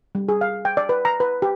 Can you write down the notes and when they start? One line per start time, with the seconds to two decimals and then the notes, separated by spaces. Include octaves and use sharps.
0.15 G3
0.29 G#4
0.41 F5
0.65 G5
0.77 D5
0.89 B4
1.05 A#5
1.20 B4
1.42 G4